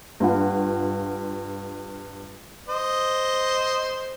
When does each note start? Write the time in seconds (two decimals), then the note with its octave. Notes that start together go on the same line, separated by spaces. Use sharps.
0.20 G2 F4 F#5
2.68 C5 D#5